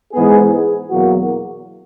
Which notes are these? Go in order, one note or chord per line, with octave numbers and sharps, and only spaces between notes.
G#2 E3 B3 G#4
E2 B2 F#3 A#3 F#4